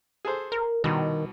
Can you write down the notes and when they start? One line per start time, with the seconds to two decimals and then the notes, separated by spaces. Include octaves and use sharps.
0.25 G#4 A4 C5
0.52 A#4
0.84 C2 B2 D#3